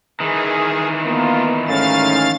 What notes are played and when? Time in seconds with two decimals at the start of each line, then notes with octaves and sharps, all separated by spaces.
0.20 D#3 E3 G#4
1.05 A#3 B3 F4
1.68 G#2 A3 C#4 F5 A6